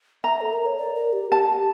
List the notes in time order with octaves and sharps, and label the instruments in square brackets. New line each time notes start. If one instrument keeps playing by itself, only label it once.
[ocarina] E5 [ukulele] A#5
[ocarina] A4
A#4
C#5
D5
A#4
G4
[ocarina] G4 [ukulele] A5